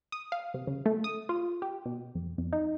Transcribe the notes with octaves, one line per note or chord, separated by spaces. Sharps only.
D#6
F5
C3
C#3
A3
D#6
F4
G4
B2
F2
F2
D#4